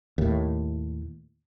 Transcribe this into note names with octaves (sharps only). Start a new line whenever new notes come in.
D#2 A2